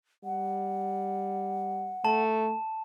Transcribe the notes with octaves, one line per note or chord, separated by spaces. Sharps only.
G3 F#5
A3 A5